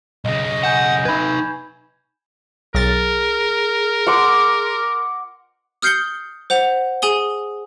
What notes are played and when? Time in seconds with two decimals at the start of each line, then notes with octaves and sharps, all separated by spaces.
0.25 B1 C#3 D#5
0.63 F#5 G#5 G6 E7
1.05 D#4 B4 B5 G#6
2.74 B1 G#4 A#4 A6
4.07 F#5 C6 D6
5.82 D#6 F6 G6 C7 C#7 G7
6.50 C5 F#5 F7
7.02 G#4 G#5 D#6 G7